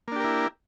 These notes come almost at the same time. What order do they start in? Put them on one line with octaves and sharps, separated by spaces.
A#3 D4 G4 A#4 E4